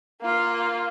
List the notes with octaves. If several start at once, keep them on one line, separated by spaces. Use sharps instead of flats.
A#3 F4